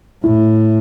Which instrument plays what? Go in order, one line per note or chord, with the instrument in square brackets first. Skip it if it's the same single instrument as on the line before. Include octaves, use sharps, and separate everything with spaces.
[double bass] A2 [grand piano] E4